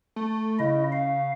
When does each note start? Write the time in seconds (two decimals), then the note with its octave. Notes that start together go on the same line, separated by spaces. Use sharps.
0.16 A3
0.60 C#3 E4 D#5
0.92 F5